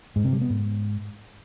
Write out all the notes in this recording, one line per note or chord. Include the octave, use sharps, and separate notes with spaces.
G#2
C3
G3
B3
G#2